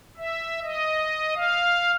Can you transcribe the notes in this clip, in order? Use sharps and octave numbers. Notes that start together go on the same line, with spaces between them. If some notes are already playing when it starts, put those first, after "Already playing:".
E5
D#5
F5